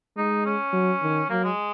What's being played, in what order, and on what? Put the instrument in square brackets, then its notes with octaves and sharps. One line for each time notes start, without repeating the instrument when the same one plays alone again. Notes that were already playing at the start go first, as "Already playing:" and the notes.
[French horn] G#3 [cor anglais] D#4
[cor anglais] C#4
[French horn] F#3
D#3
[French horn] F#3 [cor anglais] A#3
[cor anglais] G#3